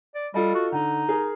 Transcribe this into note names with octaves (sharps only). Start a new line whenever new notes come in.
D5
G3 F4 A4 D#5
F#4
D3 D#4
G#4 A#4